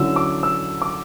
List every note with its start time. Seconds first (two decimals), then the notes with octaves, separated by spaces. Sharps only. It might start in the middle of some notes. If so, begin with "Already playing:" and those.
Already playing: D3 F#3 C#4 E4 E6
0.16 D6
0.43 E6
0.82 D6